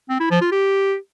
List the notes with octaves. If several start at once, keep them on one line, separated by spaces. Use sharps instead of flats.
C4
E4
F3
F4
G4